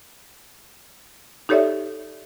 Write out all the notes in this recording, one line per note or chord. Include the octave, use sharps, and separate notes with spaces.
D#4 G4 A4 C#5 D5 E5